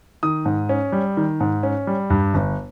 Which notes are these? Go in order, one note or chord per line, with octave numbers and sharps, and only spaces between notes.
D#3 D#6
G#2
C#4
G3
D#3
G#2
C#4
G3
G2
G1